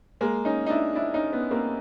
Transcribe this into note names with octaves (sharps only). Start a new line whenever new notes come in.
G#3 A#3
C#4 D#4
D#4
D4 E4
D4 E4
C#4 D#4
B3 C#4
A#3 C4